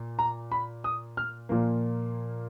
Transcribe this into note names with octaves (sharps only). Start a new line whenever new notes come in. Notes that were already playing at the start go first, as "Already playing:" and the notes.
Already playing: A#2
A#5
B5
D#6
F6
A#2 F3 A#3